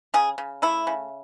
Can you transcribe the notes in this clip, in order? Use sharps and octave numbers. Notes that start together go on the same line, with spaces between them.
C#3 G#4
C#3
A3 E4
C#3